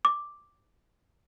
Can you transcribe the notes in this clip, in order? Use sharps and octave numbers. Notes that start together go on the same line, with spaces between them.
D6